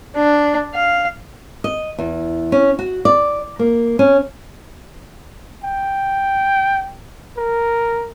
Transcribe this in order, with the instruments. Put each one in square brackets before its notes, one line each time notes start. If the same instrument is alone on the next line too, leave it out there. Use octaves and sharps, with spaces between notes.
[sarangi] D4
F5
[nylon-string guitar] D#5
E2
C#4
F#4
D5
A#3
C#4
[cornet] G5
A#4